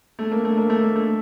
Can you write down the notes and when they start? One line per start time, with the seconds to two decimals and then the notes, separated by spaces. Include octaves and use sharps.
0.19 A3
0.32 A#3
0.45 A3
0.58 A#3
0.70 A3
0.83 A#3
0.96 A3